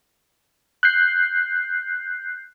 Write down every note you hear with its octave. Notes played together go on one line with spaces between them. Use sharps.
F#6 G6 C7